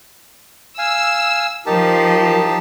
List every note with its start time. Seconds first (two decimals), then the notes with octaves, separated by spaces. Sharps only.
0.78 F5 G#5 E6
1.66 F3 D#4 G4 A#4 A5